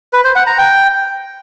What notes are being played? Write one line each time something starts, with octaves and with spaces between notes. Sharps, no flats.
B4
C5
F#5
A#5
G5